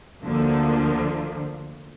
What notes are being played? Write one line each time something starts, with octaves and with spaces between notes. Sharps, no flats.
D2 D3 F3 A#3